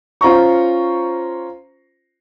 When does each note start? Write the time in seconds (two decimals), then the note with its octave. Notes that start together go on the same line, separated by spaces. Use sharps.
0.21 C#4 F4 C5 A#5 C#6